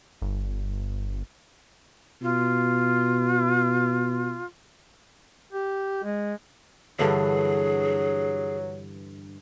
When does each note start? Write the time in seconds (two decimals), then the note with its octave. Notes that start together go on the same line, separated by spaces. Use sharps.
0.22 G1
2.22 B2 F4
5.53 G4
6.04 G#3
6.99 G2 D3 E3 F#3 G#4